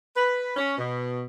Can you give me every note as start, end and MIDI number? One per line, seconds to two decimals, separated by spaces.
0.16 0.55 71
0.57 0.77 61
0.78 1.23 47